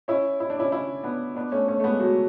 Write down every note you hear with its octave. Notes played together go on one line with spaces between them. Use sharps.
C#4 E4
E4
D4
C#4 E4
C#4 E4
B3 D4
B3 D4
A3 C#4
A3 C#4
A3
G#3 B3
F#3 A3